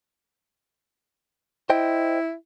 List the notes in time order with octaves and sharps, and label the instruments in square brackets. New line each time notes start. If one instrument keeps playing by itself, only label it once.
[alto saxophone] E4 [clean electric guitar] C5 D#5 G5